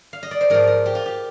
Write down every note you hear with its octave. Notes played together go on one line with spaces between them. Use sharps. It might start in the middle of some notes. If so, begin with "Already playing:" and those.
F5
D#5
D5
C5
G#2 F3 A#4
A#4
G4
F4
G4